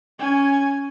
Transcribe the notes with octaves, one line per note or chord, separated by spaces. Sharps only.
C#4 G#5